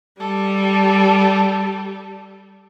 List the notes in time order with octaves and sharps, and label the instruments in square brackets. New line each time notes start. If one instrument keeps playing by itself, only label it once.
[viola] G3 [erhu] A4